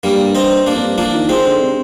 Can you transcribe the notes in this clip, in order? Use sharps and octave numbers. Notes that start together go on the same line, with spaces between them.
G2 G3 A#3
C4 D#4
G2 A#3 D4
F2
G2
F3 A#3 D4
D#3
G#3 C4
D3
C3